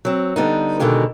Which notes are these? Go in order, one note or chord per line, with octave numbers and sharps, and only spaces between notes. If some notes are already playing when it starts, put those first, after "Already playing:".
F#3 C4
D3 G3 B3 D#4
B2 D3 D#3 G#3 G4